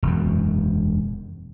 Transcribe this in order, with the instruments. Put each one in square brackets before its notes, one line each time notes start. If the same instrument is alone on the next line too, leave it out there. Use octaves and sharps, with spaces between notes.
[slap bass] E1 F#2